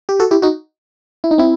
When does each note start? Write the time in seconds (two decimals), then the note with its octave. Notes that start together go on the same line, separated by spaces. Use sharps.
0.09 G4
0.20 F#4 A4
0.31 E4 G4
0.42 D#4 F#4
1.24 E4
1.31 D#4
1.38 C4 E4